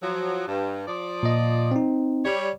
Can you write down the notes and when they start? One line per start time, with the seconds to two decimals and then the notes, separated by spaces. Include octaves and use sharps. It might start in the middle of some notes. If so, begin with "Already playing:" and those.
0.03 F3 F#3
0.48 G2
0.87 F3 D5
1.23 A#2 D#5
1.71 C4 D#4
2.25 G3 C#5 D5